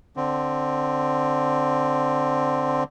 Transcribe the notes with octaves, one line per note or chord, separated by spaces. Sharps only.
D3 C4